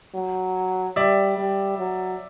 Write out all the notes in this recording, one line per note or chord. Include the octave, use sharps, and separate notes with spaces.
F#3
G3 D5 E5
G3
F#3